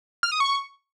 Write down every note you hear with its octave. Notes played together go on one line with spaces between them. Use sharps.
F6
D#6
C#6